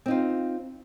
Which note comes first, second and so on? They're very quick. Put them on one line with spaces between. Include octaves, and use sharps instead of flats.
C4 D#4 F4